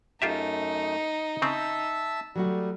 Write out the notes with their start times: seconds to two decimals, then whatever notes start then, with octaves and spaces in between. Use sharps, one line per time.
0.22 F#2 A3 D#4 F4 G4 E5
1.42 C#3 C4 E5 A5 E6
2.36 F#3 G3 A3 F#4